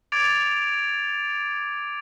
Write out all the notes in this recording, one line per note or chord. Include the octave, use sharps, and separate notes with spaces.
D6 G#6 A6 D7 F7